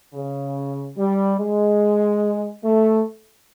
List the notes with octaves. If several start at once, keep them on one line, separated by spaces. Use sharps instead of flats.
C#3
G3
G#3
A3